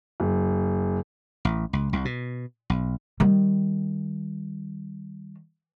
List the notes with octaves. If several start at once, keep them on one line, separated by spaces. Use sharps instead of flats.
F#1
A1
C#2
C2
B2
B1
D#3 G3